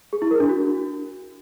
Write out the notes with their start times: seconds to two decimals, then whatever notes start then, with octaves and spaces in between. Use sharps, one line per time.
0.13 G#4
0.22 E4
0.31 A#4
0.40 D4
0.49 F#4